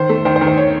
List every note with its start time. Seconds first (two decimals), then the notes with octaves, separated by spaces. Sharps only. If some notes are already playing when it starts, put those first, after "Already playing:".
Already playing: D#3 C5
0.09 A3
0.25 D#3 C5
0.36 C5
0.41 D#3
0.47 C5
0.58 C#5